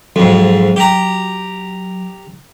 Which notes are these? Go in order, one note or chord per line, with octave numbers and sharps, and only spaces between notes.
F2 G#2 F#3
G4 A#5